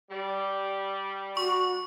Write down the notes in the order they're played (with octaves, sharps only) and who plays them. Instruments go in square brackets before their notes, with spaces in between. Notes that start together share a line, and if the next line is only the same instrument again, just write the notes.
[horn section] G3
[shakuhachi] F#4 [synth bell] C#6